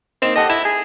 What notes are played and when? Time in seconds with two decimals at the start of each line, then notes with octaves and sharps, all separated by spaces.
0.22 A#3 C4 D#4 E7
0.36 G4 A4 D#5 F#5
0.50 E4 E7
0.65 G#4